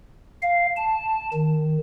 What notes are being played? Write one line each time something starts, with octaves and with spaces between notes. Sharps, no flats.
F5
A5
D#3